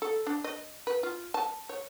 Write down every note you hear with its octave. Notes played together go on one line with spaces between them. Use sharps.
A4
D4
D#5
B4
F4
A5
C#5